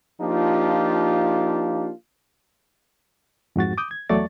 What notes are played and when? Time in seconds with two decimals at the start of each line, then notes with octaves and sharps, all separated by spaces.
0.21 F3 A#3 D4 D#4 F4 G4
3.56 F2 G#2 F#4 A6
3.78 D6 D#6 G6
3.91 G#6
4.09 E2 F#3 A3 D5 C#6 A6